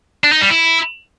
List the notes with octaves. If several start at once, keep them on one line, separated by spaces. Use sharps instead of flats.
D4
D#4
G3
E4